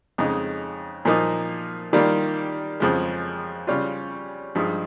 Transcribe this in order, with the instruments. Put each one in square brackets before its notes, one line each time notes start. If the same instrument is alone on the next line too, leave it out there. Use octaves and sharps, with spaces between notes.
[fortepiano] F2 C#3 G#3 D#4
A#2 F3 A#3 D#4
D#3 G3 A#3 F4
F2 C#3 F3 G#3
C#3 G3 C#4 F4
G2 F3 G#3 D#4